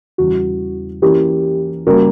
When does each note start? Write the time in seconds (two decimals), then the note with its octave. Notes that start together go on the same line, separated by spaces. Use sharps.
0.18 E2 C#3 E3 G3 F#4
1.02 E3 A#3 C#4 E4 F#4 G4 A#4
1.86 C#3 G3 A#3 F#4 A#4